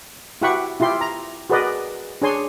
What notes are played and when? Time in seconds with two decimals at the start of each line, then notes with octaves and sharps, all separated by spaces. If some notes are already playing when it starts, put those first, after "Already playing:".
0.42 E4 F#4 G4 F#5 B5 C#6
0.80 E4 F4 G4 C6
1.01 A#5
1.50 F#4 G#4 A#4 B4 D5 D#5
2.22 D4 G#4 C#5 G#5 C6